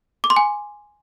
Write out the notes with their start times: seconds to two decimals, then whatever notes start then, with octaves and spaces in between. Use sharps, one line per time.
0.24 D6
0.30 C6
0.36 G#5